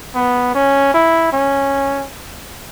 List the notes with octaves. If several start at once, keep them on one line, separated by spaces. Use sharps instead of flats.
B3
C#4
E4
C#4